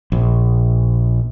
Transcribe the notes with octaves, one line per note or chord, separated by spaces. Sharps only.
A#1